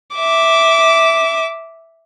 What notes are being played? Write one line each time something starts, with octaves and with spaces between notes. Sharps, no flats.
E5 D6